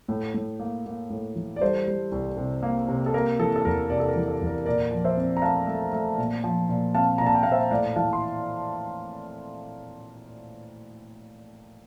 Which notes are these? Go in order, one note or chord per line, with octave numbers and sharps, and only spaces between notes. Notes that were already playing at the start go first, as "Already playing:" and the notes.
A2
A2
A#3
A#3
A2
E3
D5
G3 A4 C5
G3
C2
C3
A#3
C3
A4
A#3 A#4
E3 A4
A4
E2 A#4
C3 A#4 D5
A4
A#4
E3
A4
E2
A#4
A#2 A#4 D5
F3
C5 E5
C4
A#5
A3 F5 A5
A3
A3
A#2
F3
A#2
C4 F5 A5
A#2 A#5
A5
G5
A#2 F5
C5 E5
A2 D5 F5
E3 F5 A5
C6